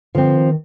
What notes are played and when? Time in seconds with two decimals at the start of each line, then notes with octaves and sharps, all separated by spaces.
0.15 D3 F3 C4
0.36 D#3